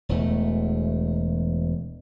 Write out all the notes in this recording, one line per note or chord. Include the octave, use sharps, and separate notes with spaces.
E1 E2 A3